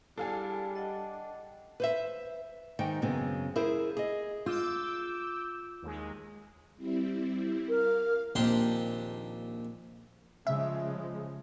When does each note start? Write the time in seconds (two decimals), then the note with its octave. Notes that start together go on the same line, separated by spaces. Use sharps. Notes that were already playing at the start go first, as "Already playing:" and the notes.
0.18 G3 D4 E4 G#4 A4 F5 G#5
0.75 D#5 F#5 G5
1.80 B4 C5 E5
2.79 G#2 D#3 G5
3.02 F#2 C#3 G#3 B3 C4
3.56 E4 G#4 A#4 C5
3.97 G#4 D#5
4.46 F4 D6 E6 G6
5.82 D#2 G#3
6.77 G3 C4 E4
7.69 A#4 F5
8.35 A#1 D#2 C4 D4 G4 C6
10.47 C#3 F3 G#3 E5